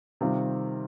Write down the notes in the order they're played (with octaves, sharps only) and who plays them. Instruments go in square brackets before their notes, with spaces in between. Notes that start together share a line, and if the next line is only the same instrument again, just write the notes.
[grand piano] C3 D#3 G3 C4 F4